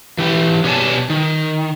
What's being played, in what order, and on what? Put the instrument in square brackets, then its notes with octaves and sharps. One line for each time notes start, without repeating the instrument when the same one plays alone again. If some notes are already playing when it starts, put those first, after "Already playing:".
[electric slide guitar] E3 G4
B2 G4 C#5 D5 G#5 A5
D#3